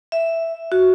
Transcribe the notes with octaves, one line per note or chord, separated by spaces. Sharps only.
E5
F#4